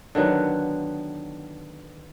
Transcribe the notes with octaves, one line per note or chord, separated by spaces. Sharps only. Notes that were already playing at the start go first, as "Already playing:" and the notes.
D3 D#3 F#3 B3